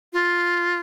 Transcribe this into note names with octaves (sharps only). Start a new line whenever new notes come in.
F4